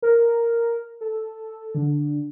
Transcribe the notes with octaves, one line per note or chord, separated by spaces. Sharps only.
A#4
A4
D3